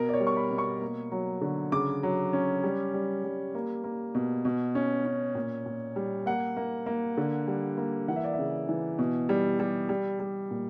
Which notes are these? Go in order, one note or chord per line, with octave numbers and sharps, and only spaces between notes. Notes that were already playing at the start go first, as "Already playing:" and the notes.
Already playing: B2 A#4
D5
C#5
G3
C#6
B5
B2
C#6
A#3
F#3
D3
C#3 D6
F#3
C#4
G3
G3
G3
A#3
A#3
B2
B2
C#4
C#4
A#2
A#2
G3
A#3 F#5
A#3
A#3
D3
G3
A#3
E3 F#5
E5
D5
E5
C#3
E3
B2
G3
G3
G3
G3
A#2